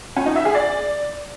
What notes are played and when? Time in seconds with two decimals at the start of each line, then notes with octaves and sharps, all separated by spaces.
0.17 C#4
0.26 D#4
0.36 E5
0.45 G#4
0.55 D5